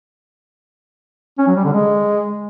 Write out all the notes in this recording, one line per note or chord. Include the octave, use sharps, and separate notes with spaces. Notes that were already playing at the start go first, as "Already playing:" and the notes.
C#4
F#3
G3
D3
G#3